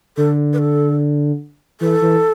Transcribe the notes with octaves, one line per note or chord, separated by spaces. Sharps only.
D3 A4
B4
A4
E3 A4
E3